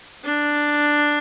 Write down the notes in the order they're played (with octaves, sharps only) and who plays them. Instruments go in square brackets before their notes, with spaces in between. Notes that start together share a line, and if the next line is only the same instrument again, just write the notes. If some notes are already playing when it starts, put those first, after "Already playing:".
[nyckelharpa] D4